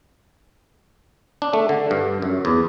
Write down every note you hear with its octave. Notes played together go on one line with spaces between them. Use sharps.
D4
A3
D3
G2
F#2
E2